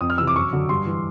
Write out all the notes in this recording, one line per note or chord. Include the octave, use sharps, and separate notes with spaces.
F2 D#6
F6
C3 E3 E6
D6
F#2 C#6
D3 F#3
G2 C6
E3